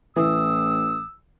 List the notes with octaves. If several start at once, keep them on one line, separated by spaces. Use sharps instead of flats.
A1 E3 D#6 E6